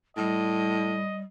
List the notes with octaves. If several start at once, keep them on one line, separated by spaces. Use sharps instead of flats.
A2 G3 D#5